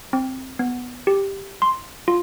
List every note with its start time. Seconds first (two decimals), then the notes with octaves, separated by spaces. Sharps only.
0.13 C4
0.59 B3
1.07 G4
1.62 C6
2.08 F4